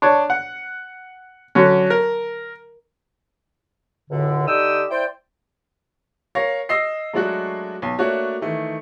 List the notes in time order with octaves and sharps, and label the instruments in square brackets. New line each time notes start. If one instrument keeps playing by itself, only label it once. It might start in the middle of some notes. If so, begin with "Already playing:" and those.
[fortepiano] D4 C#5
F#5
D3 F#3 C#4
A#4
[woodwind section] C#2 F#2 A2 D3
D3 D#4 G4 G5 D#6 E6
E4 C5 D5 G5
[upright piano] A#4 C#5 F5 A#6
D#5 E6 A#6 C7
F#3 G#3 A3 D4 F#4
B1
A3 A#3 D4 F#4 C#5
D#3 E3 A3